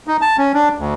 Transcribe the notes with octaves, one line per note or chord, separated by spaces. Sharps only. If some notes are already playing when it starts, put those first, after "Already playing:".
D#4
A5
C#4
D4
D2